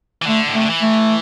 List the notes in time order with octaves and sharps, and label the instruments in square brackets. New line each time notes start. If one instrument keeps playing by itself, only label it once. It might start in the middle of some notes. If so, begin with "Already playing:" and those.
[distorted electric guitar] E3
[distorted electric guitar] D3 [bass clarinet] A3
[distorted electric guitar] A2
[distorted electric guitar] C3 [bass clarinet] A3
[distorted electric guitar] D3
E3
[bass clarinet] A3